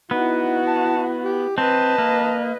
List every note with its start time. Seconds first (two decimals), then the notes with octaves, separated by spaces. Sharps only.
0.11 B3 D#4 E4 F#4
0.67 A5
1.24 G4
1.58 C4 B4 D#5 A5
1.98 A#3